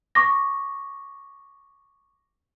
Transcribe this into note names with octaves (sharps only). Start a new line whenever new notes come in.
C#6 D6 A#6